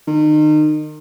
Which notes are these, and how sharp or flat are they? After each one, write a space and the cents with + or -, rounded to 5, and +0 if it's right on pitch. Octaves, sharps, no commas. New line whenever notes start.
D#3 -30